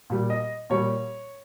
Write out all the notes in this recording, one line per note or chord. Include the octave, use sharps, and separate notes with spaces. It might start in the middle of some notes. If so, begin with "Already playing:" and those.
A#2 G3
D#5
A#2 G3 C#5